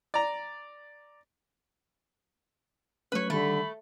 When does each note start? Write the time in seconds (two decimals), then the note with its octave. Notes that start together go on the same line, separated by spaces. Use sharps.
0.14 D5 A#5
3.12 F#3 A3 C#4 B4 C#5
3.30 D3 D#3 G3 A3 B5